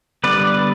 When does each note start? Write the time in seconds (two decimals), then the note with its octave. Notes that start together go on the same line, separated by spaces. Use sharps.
0.24 D3 G3 B3 B4 D5